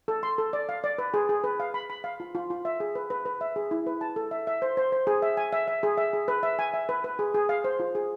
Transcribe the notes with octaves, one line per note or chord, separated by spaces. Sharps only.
A4
C6
A4
D5
F5
D5
B4
G#4
G#4
B4
F5
B5
B5
F5
F4
F4
F4
E5
G#4
B4
B4
B4
E5
G#4
E4
B4
A5
A4
E5
E5
C5
C5
C5
G#4
E5
G#5
E5
E5
G#4
E5
G#4
B4
E5
G#5
E5
B4
B4
G#4
G#4
F5
C5
F4
G#4